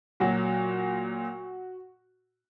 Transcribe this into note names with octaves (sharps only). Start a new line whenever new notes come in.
A#2 F#3 F#4